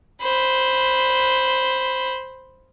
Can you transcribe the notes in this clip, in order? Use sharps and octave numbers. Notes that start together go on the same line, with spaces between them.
C5 B5